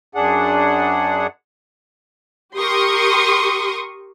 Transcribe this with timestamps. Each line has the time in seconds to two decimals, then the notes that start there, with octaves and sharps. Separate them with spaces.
0.15 F#2 D4 G#4 F#5
2.56 G4 A#4 C6 C#6 D#6